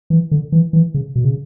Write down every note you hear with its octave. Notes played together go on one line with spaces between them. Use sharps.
E3
D3
E3
E3
C#3
B2
C#3